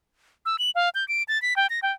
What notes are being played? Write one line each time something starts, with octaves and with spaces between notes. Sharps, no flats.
E6
F#7
F5
G6
D7
A6
B6
G5
A#6
G5